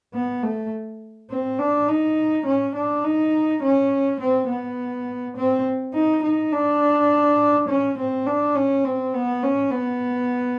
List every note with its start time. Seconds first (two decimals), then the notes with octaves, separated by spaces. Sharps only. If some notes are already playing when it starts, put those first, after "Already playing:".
0.14 B3
0.43 A3
1.30 C4
1.59 D4
1.88 D#4
2.46 C#4
2.75 D4
3.04 D#4
3.63 C#4
4.20 C4
4.49 B3
5.36 C4
5.94 D#4
6.23 D#4
6.52 D4
7.69 C#4
7.98 C4
8.26 D4
8.55 C#4
8.84 C4
9.14 B3
9.43 C#4
9.72 B3